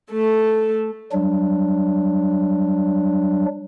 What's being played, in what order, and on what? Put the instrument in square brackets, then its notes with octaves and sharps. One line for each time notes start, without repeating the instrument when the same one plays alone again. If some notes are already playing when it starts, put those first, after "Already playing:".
[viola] A3 A4
[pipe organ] F#3 G3 D4